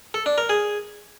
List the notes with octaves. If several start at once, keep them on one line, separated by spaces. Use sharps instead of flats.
A4
D4
A#4
G#4